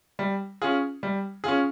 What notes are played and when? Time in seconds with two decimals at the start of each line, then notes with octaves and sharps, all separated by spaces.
0.19 G3
0.62 C#4 F4 G#4
1.03 G3
1.44 C#4 F4 G#4